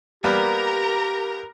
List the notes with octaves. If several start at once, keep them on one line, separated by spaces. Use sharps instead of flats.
G3 A#3 B3 G4 A#4 A#5